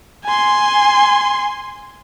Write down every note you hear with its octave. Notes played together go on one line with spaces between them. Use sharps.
G#5 C6